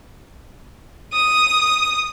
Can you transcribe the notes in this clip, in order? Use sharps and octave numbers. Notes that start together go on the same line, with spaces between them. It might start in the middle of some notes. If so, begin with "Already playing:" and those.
D#6